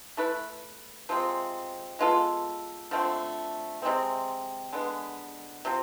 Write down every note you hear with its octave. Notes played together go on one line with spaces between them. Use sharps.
A3 E4 B4
C3 F3 G#3 C4
G#3 B3 F4 A4
D3 F3 A3 C4
C3 G#3 C4
D3 G#3 B3
C3 F3